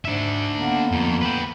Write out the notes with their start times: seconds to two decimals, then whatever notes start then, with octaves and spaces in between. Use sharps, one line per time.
0.05 G#2 D4 E5
0.57 D3 A#3 B3
0.92 F2
1.22 B4 G5